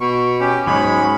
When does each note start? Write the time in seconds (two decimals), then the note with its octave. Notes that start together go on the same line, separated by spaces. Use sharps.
0.01 B2 C#6
0.40 C#4 G4
0.67 G#2 F#3 G#3 C#5 B5